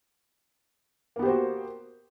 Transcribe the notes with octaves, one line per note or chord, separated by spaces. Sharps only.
A#3 B3 F#4 G4 C5